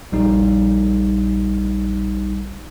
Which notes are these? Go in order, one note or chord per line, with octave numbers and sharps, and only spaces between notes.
A#1 G3 D#4